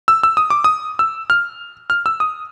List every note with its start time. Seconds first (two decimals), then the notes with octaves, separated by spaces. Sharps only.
0.08 E6
0.23 E6
0.37 D#6
0.50 D6
0.64 D#6
0.99 E6
1.30 F6
1.90 F6
2.06 E6
2.20 D#6